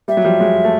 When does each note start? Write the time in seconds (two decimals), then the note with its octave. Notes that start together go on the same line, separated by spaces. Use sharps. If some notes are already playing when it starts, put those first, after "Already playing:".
0.08 G3 E5
0.17 F#3
0.24 F3 G3
0.40 F#3 G#3
0.64 A3